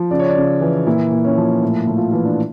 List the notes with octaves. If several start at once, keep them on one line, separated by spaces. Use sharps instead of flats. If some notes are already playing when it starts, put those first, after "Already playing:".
Already playing: F3
C#3 D5
C#5
D5
C#3
E3
A#2 E4
A#2
C#4
F3
A2 E4
A2
F4
E3 E4
D4